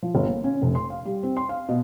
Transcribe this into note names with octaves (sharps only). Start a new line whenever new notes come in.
F3
G1
A#3
C#4
F1
C6
F5
G3
C4
C6
F5
B2